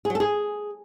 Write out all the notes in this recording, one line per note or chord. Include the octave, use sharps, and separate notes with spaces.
G#4
F#3
A4
G#4